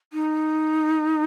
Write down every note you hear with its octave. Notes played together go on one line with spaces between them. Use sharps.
D#4